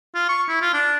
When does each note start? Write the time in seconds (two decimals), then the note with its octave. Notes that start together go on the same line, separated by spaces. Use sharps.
0.15 F4
0.29 C#6
0.48 E4
0.62 F4
0.73 D4